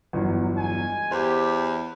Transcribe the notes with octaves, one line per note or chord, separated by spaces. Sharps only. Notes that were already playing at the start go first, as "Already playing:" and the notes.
G1 E2 F#3
G#3 G#5
E2 G4 C5